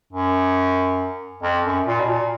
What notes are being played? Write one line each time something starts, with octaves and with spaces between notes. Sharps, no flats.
F#2
F2
F#2
A#2
B2
A#2